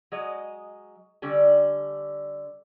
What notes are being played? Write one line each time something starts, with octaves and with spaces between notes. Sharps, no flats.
F#3 G#3 D#5
D3 G3 C#4